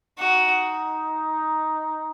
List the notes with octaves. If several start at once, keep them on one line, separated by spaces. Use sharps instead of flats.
D#4 F#4